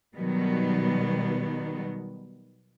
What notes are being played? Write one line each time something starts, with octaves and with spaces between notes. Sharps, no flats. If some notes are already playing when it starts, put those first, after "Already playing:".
B2 D#3 F#3 G3 B3